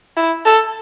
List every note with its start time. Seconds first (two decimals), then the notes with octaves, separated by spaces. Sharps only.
0.17 E4
0.46 A4